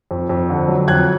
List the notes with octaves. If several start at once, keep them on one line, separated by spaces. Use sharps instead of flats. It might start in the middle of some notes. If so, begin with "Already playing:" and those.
F2
F2
D3
F#3
F2 F#6 G#6